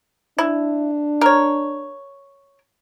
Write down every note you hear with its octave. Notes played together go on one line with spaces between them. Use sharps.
D4 E4
A#4 C#5